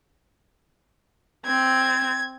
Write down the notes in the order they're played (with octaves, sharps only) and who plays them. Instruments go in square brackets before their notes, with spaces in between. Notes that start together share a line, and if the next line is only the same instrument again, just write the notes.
[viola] C4 [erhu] G#6